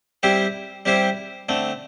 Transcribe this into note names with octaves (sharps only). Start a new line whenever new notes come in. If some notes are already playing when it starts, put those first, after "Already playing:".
G3 C4 E4 G4 C5
G3 C4 E4 G4 C5
D3 A3 C4